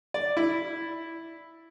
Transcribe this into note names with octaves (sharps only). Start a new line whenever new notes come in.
D5
E4